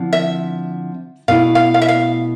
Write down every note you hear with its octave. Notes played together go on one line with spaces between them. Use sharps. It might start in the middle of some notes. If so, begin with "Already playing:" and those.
Already playing: D3 F3 C4 E4
E5
B2 A3 E4 F5
F5
F5
E5
F5